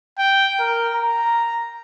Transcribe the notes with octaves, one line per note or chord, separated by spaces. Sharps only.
G5
A#4
A#5